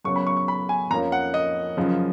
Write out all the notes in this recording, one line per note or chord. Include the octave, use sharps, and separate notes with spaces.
F#2 C#3 F#3 B3 C#6
B5
C#6
C#6
B5
G#5
F2 F3 A#3 C#4 A#5
F#5
D#5
F#2 C#3 F3